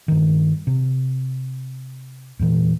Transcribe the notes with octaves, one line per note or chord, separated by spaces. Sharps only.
G2 D#3
C3
E2 A#2 E3